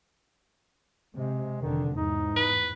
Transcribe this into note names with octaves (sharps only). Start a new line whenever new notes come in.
C3 G#3
F1 D3 D#3
E2 G#2 D#4
B4